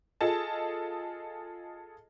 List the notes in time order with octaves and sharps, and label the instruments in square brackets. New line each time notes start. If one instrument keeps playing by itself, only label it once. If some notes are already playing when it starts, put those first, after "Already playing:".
[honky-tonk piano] F4 G#4 A4 D#5 A5